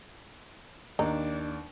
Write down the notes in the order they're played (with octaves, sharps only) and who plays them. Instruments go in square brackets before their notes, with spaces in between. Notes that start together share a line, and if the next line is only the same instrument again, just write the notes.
[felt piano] D#2 [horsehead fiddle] D4 [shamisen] D#4